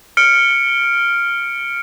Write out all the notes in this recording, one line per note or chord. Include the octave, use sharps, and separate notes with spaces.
F6 C#7 D7